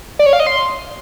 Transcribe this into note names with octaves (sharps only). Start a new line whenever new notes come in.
D5
C#5
F5
D#5
C6